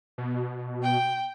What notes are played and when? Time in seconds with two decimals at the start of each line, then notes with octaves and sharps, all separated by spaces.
0.18 B2
0.82 G5